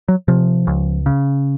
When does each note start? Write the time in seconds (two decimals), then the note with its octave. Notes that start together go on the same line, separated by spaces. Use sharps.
0.08 F#3
0.28 C3 F3
0.67 C#2
1.06 C#3